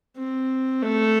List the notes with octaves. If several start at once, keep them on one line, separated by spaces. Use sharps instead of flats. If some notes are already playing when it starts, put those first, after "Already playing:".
C4
A3